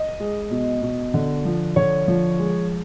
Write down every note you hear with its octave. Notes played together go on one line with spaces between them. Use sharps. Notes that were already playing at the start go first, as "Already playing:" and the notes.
Already playing: D#5
G#3
B2
B2
D3
F3
D3 C#5
F3
G#3